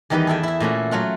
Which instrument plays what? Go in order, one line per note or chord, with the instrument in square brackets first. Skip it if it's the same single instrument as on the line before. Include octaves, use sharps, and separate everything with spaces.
[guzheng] E2 D#3 G3 D#4 B4 D#5
G#4 A4 E5 G5
E4 E5
A#2 A3 C#4 F#4
F#3 A3 F4 F#5